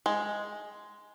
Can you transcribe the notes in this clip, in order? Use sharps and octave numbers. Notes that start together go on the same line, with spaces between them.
G#3